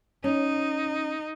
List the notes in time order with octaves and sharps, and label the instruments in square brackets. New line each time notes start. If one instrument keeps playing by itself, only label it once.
[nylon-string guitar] C#4 [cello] D#4